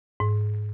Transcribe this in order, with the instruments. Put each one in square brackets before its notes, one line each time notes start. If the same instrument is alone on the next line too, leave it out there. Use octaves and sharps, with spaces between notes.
[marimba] G#2